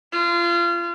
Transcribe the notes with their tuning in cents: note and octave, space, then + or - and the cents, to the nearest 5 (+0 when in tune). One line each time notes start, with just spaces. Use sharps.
F4 -30